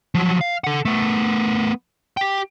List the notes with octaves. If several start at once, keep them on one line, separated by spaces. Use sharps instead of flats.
F3 F#3
F5
A4 F#5
A3 B3
G4 G5